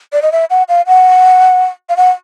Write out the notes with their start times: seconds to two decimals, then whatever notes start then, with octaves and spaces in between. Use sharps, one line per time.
0.13 D5
0.22 D#5
0.32 E5
0.50 F#5
0.69 F5
0.87 F#5
1.89 F5
1.97 F#5